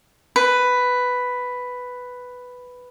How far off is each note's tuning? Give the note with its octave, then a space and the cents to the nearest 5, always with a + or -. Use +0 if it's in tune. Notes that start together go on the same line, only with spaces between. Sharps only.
B4 +5